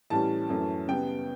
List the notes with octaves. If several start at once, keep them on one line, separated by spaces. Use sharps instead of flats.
A2 E3 G3 C#4 A5
F#2 E3 A3 C#4
C#3 G3 B3 G5